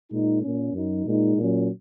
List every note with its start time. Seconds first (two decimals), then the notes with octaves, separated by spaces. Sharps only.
0.09 A#2 G#3 D#4
0.41 A#2 A#3 C#4
0.73 F#2 F#3 D#4
1.05 A#2 G#3 D#4
1.37 A#2 F#3 C#4